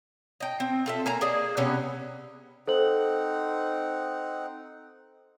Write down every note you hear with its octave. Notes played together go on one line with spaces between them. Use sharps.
D#5 G5
C4
F4 A4 E5
A#3 G#5 A#5
A#3 G#4 D5 D#5
C3 B3 C#4
C4 D#4 A4 C5 F#5 F#7